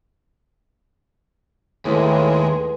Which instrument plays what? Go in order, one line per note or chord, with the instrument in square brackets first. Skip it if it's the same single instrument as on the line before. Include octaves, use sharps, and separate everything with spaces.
[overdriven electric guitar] D#2 [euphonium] A2 [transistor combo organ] G#3 [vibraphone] B4